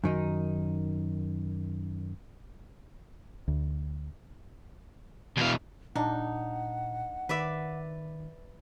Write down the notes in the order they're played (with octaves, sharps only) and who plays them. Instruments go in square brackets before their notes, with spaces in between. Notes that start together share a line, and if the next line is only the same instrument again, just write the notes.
[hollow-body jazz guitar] F#2 D#3 D#4
[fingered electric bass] D2
[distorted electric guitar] E2 F5 [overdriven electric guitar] B2 E3
[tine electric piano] A#2 [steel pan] D4 [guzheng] D#4 [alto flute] F#5
[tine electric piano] D#3 [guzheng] B4 D5 E5